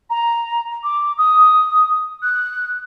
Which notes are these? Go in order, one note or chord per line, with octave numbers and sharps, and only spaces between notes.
A#5
D6
D#6
F#6